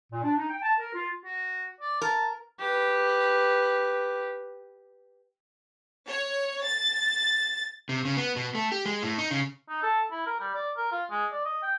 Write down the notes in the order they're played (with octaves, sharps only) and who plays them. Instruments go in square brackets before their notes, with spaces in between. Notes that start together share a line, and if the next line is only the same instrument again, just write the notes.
[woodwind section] A#2
D4
D#4
G5
A5
A#4
F4
[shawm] F#4
D5
[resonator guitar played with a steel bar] A#4 [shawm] A5
[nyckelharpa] G4 B4
[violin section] C#5
A6
[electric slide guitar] C3
C#3
B3
B2
A3
G4
G#3
A2
D#4
C#3
[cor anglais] D#4
A4
E4
A#4
G3
D5
A#4
F4
G#3
D5
D#5
G5